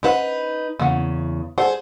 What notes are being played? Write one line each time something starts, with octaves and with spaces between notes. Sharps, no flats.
C#4 D#4 B4 C5 F#5
E2 C#3 A#3 F#5
G3 G#4 A4 C5 F#5